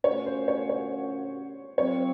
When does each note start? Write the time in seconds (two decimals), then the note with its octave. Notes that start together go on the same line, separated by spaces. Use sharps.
0.04 A#2 A3 C#4 F#4 C#5
0.26 C5
0.48 C#5
0.69 C#5
1.77 C3 F#3 C4 F4 C#5